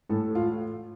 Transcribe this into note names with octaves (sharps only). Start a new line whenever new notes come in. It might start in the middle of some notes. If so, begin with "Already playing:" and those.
A2 A3 A4
F4